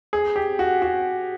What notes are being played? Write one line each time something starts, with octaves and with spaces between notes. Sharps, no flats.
G#4
G4
F#4
F#4